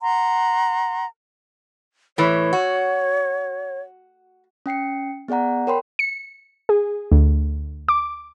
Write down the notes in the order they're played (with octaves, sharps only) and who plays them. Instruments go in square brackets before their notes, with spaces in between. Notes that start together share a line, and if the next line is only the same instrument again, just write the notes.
[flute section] F#5 A#5 C6
[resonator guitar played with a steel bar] A2 E3 [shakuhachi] C#5
[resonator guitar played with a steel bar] F#4
[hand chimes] C#4 G5 C7 C#7
B3 G#4 D5 F#5 A#5
A#4 C#5 G5 B5 C6
[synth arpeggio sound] C#7
G#4
D2
D6